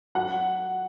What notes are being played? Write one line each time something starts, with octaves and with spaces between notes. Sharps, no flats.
F#3 F#5